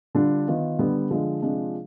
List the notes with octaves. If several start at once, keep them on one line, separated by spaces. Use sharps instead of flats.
D3 G3 D4 F4
D#3 B3 F4
D3 G3 B3
D3 F3 G#3
C3 F3 G#3 D4 F4